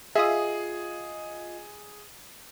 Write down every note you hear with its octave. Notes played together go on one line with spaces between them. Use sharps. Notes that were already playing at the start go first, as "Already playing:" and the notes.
F4 G#4 D#5 E5 D#6